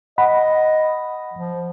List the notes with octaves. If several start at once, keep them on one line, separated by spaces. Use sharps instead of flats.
D#5 F#5 B5
F3